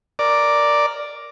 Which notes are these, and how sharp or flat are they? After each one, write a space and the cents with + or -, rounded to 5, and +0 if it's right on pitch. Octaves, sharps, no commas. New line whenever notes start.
A#4 +0 D5 +0